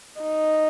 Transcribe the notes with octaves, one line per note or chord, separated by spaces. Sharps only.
D#4